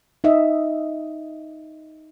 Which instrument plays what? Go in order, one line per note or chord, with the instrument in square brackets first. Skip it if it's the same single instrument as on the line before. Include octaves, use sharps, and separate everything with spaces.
[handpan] D#4 D#5 E5